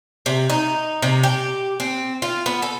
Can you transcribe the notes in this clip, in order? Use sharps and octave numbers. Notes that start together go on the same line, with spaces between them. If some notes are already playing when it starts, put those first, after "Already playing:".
C3
D#4
C3
G4
C4
F4
B3
A4